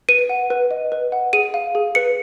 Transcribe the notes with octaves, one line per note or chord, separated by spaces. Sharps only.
B4 D#7
F#5
B4
D#5
B4
F#5
G#4 D#7
F5
G#4
B4 C#7